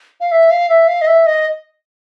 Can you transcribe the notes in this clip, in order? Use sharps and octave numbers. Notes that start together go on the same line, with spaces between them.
F5
E5
F5
E5
F5
D#5
E5
D#5